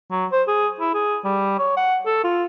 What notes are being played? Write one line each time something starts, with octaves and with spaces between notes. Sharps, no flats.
F#3
C5
G#4
E4
G#4
G3
C#5
F#5
A4
F4